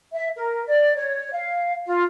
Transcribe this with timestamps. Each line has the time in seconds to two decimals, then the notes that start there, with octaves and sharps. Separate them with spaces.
0.13 E5
0.36 A#4
0.68 D5
0.96 C#5
1.33 F5
1.86 F4